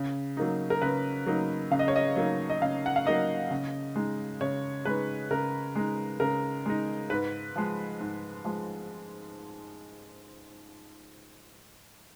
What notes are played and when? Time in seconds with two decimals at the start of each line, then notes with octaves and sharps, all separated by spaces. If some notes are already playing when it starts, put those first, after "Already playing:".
Already playing: C#3
0.37 F#3 A#3 D#4
0.70 A#4
0.82 C#3 B4
1.26 F#3 A#3 D#4
1.71 C#3 F5
1.79 D#5
1.88 C#5
1.96 D#5
2.16 F#3 A#3 D#4
2.50 D#5
2.61 C#3 F5
2.86 F#5
2.96 F5
3.06 F#3 A#3 D#4 D#5
3.51 C#3
3.96 G#3 D#4
4.41 C#3 C#5
4.85 G#3 D#4 B4
5.31 C#3 A#4
5.76 G#3 D#4
6.20 C#3 A#4
6.66 G#3 D#4
7.10 G#2 B4
7.56 F3 G#3
8.00 G#2
8.45 F3 G#3